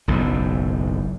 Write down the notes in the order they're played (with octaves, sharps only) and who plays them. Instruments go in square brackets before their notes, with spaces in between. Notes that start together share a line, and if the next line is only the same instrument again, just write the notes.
[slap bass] F#1 B1 G#2